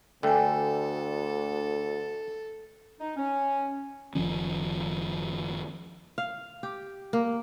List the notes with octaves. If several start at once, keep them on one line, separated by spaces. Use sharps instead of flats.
D2 D3 A3 A4 G5 G#5
D#4
C#4
F#1 D#3 F3 C#4
F5
G4
A#3